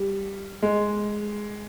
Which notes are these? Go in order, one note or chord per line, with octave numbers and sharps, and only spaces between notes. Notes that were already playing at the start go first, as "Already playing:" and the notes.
Already playing: G3
G#3